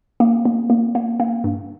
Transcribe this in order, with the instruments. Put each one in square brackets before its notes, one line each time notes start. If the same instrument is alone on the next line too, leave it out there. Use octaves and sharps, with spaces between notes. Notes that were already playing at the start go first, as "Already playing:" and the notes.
[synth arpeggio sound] A#3
A#3
A#3
A#3
A#3
G2